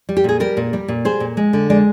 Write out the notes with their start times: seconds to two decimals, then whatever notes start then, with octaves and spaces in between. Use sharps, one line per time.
0.09 G3
0.17 G4
0.24 A#2 G#4
0.40 G3 G4 A#4
0.57 A#2
0.73 G3
0.88 A#2
1.05 G3 G#4 C5
1.20 A#2
1.37 G#3
1.53 D3
1.70 G#3 D5